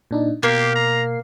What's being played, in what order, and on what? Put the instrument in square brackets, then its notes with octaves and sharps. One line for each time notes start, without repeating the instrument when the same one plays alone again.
[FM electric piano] A#2 D4 D#4
[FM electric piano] B2 C7 [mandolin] A#3 [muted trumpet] G4
[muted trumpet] A#5